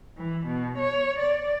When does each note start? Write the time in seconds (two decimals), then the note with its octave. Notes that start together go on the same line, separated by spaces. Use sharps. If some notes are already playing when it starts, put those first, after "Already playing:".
0.16 E3
0.47 B2
0.78 C#5
1.18 D5